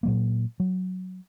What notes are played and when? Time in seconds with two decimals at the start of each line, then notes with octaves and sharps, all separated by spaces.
0.03 A#2 F#3 A#3
0.60 F#3